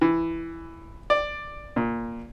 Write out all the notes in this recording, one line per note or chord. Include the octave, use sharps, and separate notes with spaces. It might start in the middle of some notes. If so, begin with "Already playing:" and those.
E3
D5
A#2